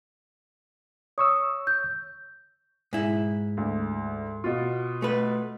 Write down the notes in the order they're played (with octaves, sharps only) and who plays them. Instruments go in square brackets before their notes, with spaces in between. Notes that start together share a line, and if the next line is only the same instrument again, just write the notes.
[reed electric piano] C#5 C#6 E6 [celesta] D#6
[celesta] G6
[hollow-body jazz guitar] G#2 E4
[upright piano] D2
B2 F4
[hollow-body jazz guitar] A3 B4